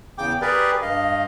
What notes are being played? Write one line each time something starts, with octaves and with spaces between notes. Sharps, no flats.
E2 C#3 G5 D6
G4 G#4 A#4 B4 D5
G2 D#5 F5